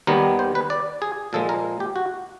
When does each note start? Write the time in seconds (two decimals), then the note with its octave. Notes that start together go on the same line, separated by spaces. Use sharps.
0.07 D#2 D#3 G3 B3 A#4
0.39 C5
0.55 B4
0.70 D5
1.02 G#4
1.33 A#2 F3 G#3 A4
1.49 A#4
1.80 G4
1.96 F#4